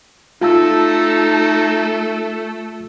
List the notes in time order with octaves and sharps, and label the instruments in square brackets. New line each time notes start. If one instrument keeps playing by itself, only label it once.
[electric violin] A3 A4 [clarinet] D#4 [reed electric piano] F4 A5 E6